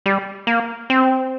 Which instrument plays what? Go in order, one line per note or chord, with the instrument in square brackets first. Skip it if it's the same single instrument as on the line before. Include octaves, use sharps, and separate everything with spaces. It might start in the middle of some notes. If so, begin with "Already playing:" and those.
[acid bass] G3
A#3
C4